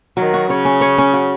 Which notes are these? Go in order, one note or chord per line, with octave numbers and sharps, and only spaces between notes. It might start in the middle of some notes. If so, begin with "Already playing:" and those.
D#3 F#3
F#4
C#3 C#5
C#4
C#5
C#4
F#4